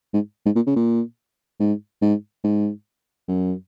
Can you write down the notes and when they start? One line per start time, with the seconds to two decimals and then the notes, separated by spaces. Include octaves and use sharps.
0.13 G#2
0.46 G#2
0.56 A#2
0.67 C#3
0.76 A#2
1.60 G#2
2.02 G#2
2.44 G#2
3.28 F#2